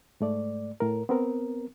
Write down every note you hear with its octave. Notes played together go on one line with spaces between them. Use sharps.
G#2 A3 D5
A2 A#4
B3 C4 A#4